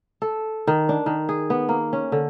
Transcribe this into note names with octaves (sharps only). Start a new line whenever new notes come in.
A4
D#3
D4
D#3
G#4
B3
A#3
C#4
D3